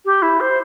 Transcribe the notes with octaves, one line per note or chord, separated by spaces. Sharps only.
G4
E4
C5